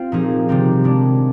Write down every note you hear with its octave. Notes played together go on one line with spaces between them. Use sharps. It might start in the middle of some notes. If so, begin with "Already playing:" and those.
Already playing: C4 F4
A#2 F3 A#3 D#4 G#4
C3 D#3 G3 C4 D#4
A#2 G#3 D4